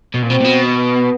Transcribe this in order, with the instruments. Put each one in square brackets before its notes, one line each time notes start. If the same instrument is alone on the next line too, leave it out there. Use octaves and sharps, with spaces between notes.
[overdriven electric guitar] B2
A#2
[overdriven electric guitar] B2 [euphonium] C4
[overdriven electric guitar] A#2
B2
[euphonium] B3